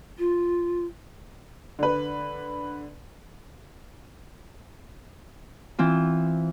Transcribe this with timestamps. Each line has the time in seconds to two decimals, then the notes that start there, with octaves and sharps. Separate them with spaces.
0.19 F4
1.79 D3 B4
5.79 E3 C4 F4